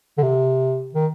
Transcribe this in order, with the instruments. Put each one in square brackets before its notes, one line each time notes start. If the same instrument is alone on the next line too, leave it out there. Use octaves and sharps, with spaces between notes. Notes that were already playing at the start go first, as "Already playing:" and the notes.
[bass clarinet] D3
C3
D#3